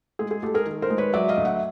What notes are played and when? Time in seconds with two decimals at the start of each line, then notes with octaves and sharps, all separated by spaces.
0.19 G#3 G#4
0.31 G#4
0.43 G#3 G4 A4
0.54 G#4 A#4
0.66 D#3
0.82 A#4 C5
0.90 G#3
0.98 B4 C#5
1.14 F#3 D5 E5
1.29 D#5 F5
1.37 D2
1.45 E5 F#5